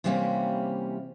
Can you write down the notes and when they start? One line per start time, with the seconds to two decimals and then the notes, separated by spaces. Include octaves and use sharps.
0.04 C3 E3 G3 A#3 C4 C#4